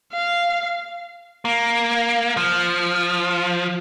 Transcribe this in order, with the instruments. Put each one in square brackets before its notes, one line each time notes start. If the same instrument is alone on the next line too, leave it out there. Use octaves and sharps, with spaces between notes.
[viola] F5
[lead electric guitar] A#3
F3